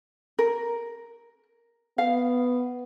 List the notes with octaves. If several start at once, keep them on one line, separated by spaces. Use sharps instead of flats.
A#4
B3 F5